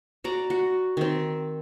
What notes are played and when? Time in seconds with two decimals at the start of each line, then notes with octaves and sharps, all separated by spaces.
0.24 F#4 D5 A#5
0.50 F#4 F#5
0.97 D#3 C4